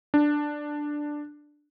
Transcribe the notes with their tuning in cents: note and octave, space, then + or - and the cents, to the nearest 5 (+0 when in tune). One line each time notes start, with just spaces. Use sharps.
D4 +5